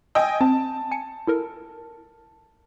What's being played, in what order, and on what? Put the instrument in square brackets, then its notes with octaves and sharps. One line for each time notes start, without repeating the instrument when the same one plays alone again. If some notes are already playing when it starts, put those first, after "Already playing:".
[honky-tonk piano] D#5 G5 G#5 [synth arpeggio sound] E6
[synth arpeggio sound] C4 [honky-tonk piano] A5
[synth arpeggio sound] G#5 C#7
E4 A4 A#4